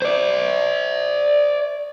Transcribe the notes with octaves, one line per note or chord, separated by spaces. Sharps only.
C5 D5